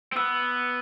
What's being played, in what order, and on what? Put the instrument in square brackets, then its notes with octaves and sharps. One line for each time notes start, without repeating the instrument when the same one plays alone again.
[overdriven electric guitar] C4
[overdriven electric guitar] B3 [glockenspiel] E6